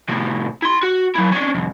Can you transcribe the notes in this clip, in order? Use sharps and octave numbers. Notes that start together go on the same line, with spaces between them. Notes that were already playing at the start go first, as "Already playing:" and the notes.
A2 C3
E4 C6
F#4
F#3 E4
C#4 D4
C2 F2